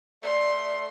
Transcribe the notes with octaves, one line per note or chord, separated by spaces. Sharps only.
A3 D5 C6